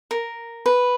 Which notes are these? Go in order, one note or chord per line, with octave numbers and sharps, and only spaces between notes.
A#4
B4